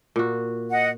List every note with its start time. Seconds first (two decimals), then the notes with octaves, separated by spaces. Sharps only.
0.16 A#2 F#4
0.70 D#5 F#5